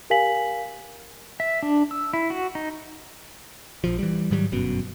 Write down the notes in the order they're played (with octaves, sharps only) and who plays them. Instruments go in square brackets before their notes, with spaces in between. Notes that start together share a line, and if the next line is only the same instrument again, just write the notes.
[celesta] G4 A#4 F5 G#5 B6 F#7
[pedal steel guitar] E5
D4
E6
E4
F#4
D#4
[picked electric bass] A#1 F3
E3 G3
G#2 D#3 F#3 G3
G1 F#2 B2